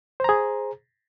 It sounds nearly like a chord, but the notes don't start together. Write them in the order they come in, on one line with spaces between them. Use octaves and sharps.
C5 A#5 G#4